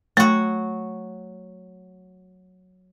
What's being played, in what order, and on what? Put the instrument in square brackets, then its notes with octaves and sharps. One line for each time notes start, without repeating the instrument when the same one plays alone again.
[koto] F#3 F#4 [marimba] A3